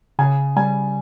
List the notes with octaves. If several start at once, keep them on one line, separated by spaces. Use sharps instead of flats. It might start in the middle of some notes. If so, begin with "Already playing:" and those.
C#3 G#5
G3 G#5